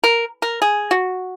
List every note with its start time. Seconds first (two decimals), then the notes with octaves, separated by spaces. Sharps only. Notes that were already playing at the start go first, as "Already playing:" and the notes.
0.04 A#4
0.42 A#4
0.62 G#4
0.91 F#4